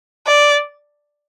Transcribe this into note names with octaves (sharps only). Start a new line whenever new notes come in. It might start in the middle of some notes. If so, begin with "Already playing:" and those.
D5